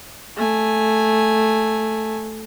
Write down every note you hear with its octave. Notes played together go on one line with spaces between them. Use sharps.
A3 G#5